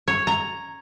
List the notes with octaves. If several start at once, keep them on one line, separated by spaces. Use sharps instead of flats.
C#5
A#5